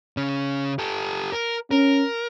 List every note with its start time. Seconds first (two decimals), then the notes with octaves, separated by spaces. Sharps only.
0.17 C#3 C#4
0.79 G4 A4
1.32 A#4
1.71 C#4 A#4